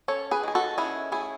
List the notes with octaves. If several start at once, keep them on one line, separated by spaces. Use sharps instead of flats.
C#4 A4 C#5
G#4 B4
D#3 G#4
F#4 A4
C#4 E4 G#4
A3 E4 G#4